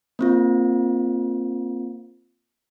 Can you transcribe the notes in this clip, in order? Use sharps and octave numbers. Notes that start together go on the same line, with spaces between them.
A#3 C4 F4